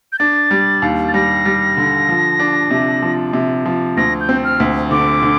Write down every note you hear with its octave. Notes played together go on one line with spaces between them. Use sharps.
G6
D4 A6
G3
D#2
A6
G3 A#6
G3
D3
F3
D4
C3
F3
C3
F3
D2 A#6
G6
C4
F6
D2
D3 D6
D3